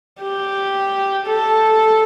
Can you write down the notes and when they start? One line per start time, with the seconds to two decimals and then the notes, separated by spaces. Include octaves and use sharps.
0.22 G4
1.26 A4